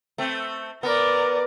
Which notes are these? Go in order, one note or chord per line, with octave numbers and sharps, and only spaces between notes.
A3 C4
B3 A#4 D5